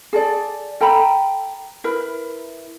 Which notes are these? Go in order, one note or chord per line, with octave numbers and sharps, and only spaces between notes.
G#4 A4 D5
A4 G5 A#5 B5
E4 A#4 B4